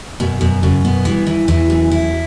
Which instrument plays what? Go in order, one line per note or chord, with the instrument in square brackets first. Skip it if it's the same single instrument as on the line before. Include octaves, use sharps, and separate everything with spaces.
[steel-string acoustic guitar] F#2 [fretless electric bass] B2
[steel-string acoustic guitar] F#2 [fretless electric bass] B2
[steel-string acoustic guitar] F#2 [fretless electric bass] C#3
[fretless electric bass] B2 [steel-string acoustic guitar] B3
[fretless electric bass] G2 [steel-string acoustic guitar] E3
[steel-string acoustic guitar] E3
[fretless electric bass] E2 [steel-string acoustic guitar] E3
[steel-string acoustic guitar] F#2
E4